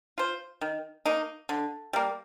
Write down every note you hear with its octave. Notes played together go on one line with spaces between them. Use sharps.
F4 C5
D#3
A#3 D#4
D3
G3 A#3